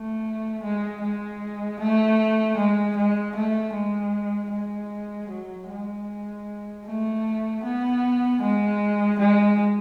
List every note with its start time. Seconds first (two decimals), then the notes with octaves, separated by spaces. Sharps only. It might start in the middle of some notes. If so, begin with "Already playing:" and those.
Already playing: A3
0.63 G#3
1.02 G#3
1.80 A3
2.57 G#3
2.96 G#3
3.35 A3
3.74 G#3
4.52 G#3
5.30 F#3
5.69 G#3
6.86 A3
7.64 B3
8.41 G#3
9.19 G#3